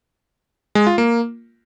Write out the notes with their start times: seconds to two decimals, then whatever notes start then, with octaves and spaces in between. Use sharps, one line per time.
0.75 G#3
0.87 F4
0.98 A#3